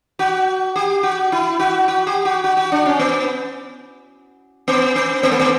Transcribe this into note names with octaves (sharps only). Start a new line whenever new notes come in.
F#4
G4
F#4
E4
F#4
F#4
G4
F#4
F#4
F#4
D4
C#4
B3
B3
B3
B3
A3
B3